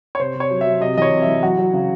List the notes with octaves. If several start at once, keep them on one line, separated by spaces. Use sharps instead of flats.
C#5
C3 C5
C3
C#5
F#3
F#3 E5
C3 D#5
E3 C#5 D#5
C3
E3 E5
F#3 F#4
F#3
C#3